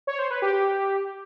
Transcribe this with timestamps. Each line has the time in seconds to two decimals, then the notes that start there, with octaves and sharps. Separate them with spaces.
0.07 C#5
0.19 C5
0.31 B4
0.42 G4